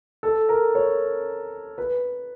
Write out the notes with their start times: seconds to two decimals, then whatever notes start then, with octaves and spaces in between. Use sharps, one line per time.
0.23 A4
0.49 A#4
0.75 C#5
1.78 B4